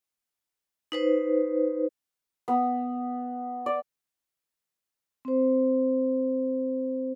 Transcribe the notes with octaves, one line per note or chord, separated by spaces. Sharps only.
D#4 B4 C5
B3
D5
C4 C5